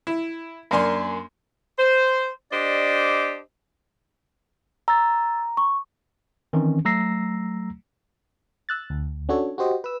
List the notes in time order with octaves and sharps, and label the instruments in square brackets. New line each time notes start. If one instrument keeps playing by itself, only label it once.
[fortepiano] E4
F#2 A#3 D4 G#5 C6
[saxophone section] C5
D4 G4 C5 D5 D#5
[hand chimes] A#5 [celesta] E6 A6
[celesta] C#6
[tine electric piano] D#3 E3 C4 C#4
F#3 A3 A#5 E6 A#6 C7
[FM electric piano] E6 F#6 A6
D2
C#4 D4 F#4 A4 C#5
F#4 G4 C5 D#5
B4 E6